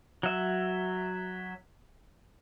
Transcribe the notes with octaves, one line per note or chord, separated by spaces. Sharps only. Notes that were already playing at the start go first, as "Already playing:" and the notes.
F#3 E5